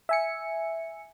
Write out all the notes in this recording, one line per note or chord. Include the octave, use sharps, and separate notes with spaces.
E5 G#5 C#7